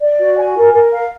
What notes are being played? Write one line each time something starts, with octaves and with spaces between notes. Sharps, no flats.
D5
F#4
G#5
A#4
A#4
F5